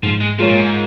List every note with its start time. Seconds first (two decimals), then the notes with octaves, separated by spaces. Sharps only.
0.03 G#2 F3
0.20 G#3
0.39 F3 G#3 F4 A#4 C#5
0.48 A#2
0.56 G#2